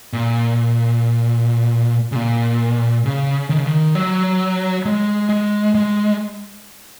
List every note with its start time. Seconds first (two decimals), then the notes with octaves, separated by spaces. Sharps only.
0.13 A#2
2.12 C#3
2.16 A#2
3.05 C#3
3.50 D#3
3.58 C#3
3.66 D#3
3.95 F#3
4.86 G#3
5.29 G#3
5.75 G#3